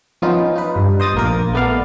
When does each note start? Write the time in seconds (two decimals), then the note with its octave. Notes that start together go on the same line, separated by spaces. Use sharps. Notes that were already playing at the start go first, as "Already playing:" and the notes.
0.22 F3 B3 C#4 D#4 F4
0.56 D#4 B4
0.76 G2
1.00 C5 D#5 D#6 A6
1.14 A#1 A#3 A#4
1.53 A3 B3 D5 F5